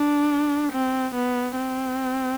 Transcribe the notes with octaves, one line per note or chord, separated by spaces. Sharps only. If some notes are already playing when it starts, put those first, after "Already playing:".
Already playing: D4
C4
B3
C4